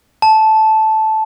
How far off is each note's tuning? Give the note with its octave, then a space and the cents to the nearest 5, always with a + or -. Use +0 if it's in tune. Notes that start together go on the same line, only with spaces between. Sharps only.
A5 -10